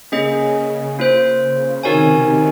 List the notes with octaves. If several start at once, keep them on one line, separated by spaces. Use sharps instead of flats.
C#3 A#3 C#4 G#4 D#5
A#3 F4 C5
C#3
C3 D#3 D#4 F#4 A#4 C#5 G#5